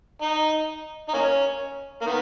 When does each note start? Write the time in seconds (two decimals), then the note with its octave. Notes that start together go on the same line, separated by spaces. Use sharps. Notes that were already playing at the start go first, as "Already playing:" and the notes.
0.22 D#4
1.08 D#4
1.14 A#3 C#4
2.02 A#3
2.07 D#3 B3